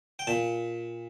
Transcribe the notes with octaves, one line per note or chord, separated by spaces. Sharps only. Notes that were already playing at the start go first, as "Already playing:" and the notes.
G5
A#2 A5